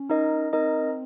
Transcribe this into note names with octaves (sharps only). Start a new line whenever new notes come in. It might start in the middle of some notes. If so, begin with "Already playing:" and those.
Already playing: C#4
D#4 A#4 D#5
C4 D#4 A#4 D#5